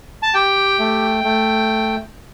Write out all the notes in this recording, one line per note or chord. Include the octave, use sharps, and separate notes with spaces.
A5
G4 G5
A3
A3